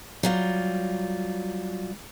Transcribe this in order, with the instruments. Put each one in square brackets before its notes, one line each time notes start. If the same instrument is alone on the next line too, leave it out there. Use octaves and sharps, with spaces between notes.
[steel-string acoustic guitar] F#3 G3 F4